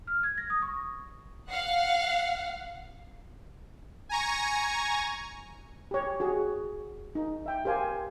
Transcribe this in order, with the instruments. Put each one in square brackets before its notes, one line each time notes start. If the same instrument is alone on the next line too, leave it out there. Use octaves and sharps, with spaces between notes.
[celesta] F6
G#6
A#6
D#6
C#6
[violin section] F5 F#5
[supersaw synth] G#5 A#5 C#6
[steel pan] G4 C#5
F#4 G#4 C#5
D#4
E5 G5
G4 A#4 C5 F5 G#5